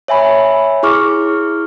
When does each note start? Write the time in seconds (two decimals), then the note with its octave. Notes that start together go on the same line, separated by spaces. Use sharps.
0.08 C#5 E5 G#5 B5
0.83 E4 G#4 C#6 D6 F6